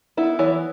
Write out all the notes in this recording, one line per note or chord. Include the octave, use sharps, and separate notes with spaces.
B3 E4
E3 C#5